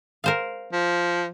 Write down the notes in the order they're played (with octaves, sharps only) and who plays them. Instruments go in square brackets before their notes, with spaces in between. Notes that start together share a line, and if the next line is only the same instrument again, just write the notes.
[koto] A#4 C5 F5
[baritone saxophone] F3